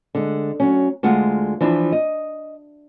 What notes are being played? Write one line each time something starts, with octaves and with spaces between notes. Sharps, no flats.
D3 G#3
F#3 C#4
D2 G#3 F4 F#5
E3 F3 D4 E4
D#5